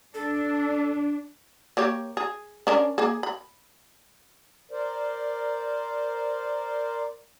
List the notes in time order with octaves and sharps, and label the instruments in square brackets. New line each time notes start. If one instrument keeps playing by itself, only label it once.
[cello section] D4 [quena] A4
[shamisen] A#3 G4 C#5
G#4
C#4 D4 A#4
A#3 G#4
B5
[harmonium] A#4 C5 D5